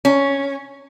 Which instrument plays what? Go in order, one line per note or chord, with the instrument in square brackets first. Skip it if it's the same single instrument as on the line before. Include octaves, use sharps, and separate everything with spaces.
[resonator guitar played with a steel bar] C#4